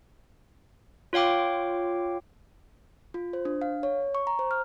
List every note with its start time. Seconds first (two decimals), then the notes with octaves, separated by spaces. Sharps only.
1.13 F4 C#5 F5 G5 D6
3.14 F4
3.33 C5
3.45 D4
3.62 F5
3.83 C#5
4.15 C#6
4.27 A#5
4.39 C5
4.51 F6